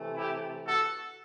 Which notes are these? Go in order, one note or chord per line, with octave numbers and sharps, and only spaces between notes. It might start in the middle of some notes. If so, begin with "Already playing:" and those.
Already playing: C3 E3 A3
E4 G4
F#4 A4